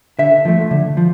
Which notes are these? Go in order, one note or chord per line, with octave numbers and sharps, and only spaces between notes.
D3 E5
F3 A3
D3
F3